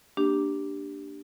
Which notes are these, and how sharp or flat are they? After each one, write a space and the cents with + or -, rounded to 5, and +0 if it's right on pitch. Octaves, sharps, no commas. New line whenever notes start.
A#3 +0 D4 +0 G4 +0